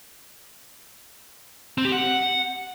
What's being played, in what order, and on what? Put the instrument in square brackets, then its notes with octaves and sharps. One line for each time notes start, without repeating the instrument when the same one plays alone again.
[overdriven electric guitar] C4
G4
F#5